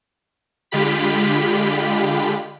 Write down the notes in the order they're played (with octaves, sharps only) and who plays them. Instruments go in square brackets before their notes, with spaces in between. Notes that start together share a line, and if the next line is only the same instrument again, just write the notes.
[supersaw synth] D3 G#3 F4 G4 B5 B6